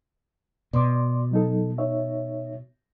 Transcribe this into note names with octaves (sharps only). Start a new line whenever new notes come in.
B2 D5 C6 D6
F#3 D#4 A4
D#4 C#5 E5